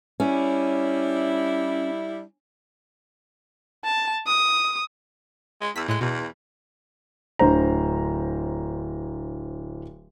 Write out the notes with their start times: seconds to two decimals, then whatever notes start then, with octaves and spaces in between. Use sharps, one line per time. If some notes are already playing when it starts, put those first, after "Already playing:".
0.20 G3 C#4 D4 E4
3.84 A5
4.27 D#6
5.61 G#3
5.76 E2 E6 B6
5.88 A2 G#3 F#6
6.01 E2 B2
7.39 D1 D3 C5 A#5